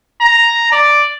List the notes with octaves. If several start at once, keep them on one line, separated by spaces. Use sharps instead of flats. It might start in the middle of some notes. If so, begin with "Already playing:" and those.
A#5
D5